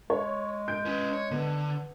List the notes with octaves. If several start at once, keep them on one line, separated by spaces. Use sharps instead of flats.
G#3 C#5
G6 D7
C#4 B4
C#5
D3 B3